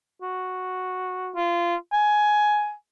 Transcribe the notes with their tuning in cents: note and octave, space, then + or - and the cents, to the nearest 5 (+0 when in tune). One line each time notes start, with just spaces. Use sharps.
F#4 -5
F4 -20
G#5 +10